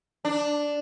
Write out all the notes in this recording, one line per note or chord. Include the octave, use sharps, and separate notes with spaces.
D4